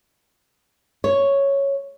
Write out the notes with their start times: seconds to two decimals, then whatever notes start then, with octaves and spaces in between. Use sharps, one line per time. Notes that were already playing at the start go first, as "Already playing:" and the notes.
1.04 C#5